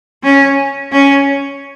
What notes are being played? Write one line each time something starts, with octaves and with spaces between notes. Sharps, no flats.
C#4
C#4